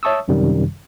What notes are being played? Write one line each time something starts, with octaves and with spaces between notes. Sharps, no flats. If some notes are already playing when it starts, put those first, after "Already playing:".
C#5 E5 A5 C#6 D#6 E6
A1 F#2 C3 D#3 G3